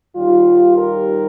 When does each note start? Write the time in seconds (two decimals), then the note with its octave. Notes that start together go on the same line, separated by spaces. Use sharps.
0.16 D#2 D#3 G3 F4
0.77 A#4